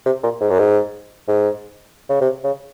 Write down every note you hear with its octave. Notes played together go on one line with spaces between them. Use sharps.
C3
A#2
G#2
F#2
G#2
G#2
C#3
C3
C#3